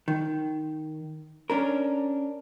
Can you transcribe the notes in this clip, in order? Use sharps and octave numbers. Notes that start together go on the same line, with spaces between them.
D#3
C#4 D4 A#4